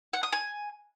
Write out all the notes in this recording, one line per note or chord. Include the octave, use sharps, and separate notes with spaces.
F#5
D#6
G#5